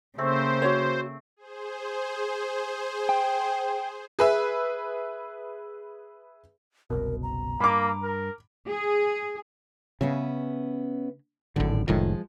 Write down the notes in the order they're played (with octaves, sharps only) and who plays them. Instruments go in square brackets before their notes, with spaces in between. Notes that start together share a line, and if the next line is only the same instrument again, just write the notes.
[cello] C#3 A#3 [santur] A3 C4 [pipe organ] C5
[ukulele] F#4 C#5
[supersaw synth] G#4 C5
[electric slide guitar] G5
[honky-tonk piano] G#4 B4 E5
[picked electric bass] F#1 C2 B2 [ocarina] A#4
[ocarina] A#5
[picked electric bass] G2 [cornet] A#3 [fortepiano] B5 D6
[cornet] A#4
[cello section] G#4
[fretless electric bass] C#3 [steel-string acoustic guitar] B3 C#4 E5
[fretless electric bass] G#1 D3 [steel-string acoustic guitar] F#2 A2 D5
[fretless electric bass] F1 A2 D#3 [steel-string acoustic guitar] F3 G#3